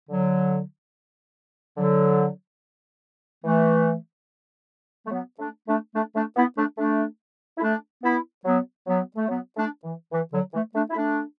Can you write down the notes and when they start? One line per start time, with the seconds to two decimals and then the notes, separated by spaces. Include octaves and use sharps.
0.10 D3 F#3
1.77 D3 F#3
3.44 E3 A3
5.06 A3
5.11 F#3 B3
5.39 A3 D4
5.67 A3 D4
5.95 A3 D4
6.15 A3 D4
6.36 B3 E4
6.57 A3 D4
6.78 A3 D4
7.58 E4
7.61 A3 D4
8.03 B3 E4
8.45 F#3 B3
8.87 F#3 B3
9.16 A3
9.28 F#3 B3
9.56 A3 D4
9.84 E3
10.12 E3
10.33 D3 F#3
10.53 E3 A3
10.75 A3 D4
10.90 E4
10.95 A3 D4